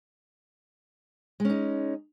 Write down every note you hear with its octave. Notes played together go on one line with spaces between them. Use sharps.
G#3 C#4 D#4